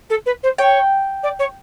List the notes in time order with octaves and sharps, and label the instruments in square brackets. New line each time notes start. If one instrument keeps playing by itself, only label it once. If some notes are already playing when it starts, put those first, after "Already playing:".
[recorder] A4
B4
C5
[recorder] C#5 [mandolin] G5
[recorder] D5
C#5